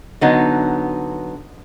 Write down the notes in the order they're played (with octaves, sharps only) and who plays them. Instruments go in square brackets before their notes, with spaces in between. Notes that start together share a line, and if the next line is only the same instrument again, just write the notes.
[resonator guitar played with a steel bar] D3 F#3 B3 D#4